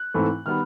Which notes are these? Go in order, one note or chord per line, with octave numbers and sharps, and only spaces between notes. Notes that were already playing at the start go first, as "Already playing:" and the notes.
Already playing: F#6
G#2 E3 A3 C4
D#3 G3 B3 F6